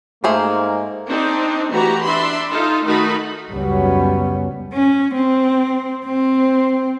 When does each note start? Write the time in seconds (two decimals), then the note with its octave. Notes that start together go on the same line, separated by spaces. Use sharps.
0.24 G#2 A3 A#3 G#4 C5
1.09 C4 D4 D#4
1.71 E3 A3 F#4 G4 A#5
2.04 D4 E5 B5 C6
2.52 D#4 F4 A4
2.87 D#3 A3 D#4 F#4 B5
3.51 C#2 F#2 F#3 G3 B3 C#4
4.73 C#4
5.15 C4
6.06 C4